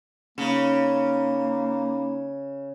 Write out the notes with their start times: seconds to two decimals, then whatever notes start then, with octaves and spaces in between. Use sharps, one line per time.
0.38 C#3 A#3 C#4 D#4 B5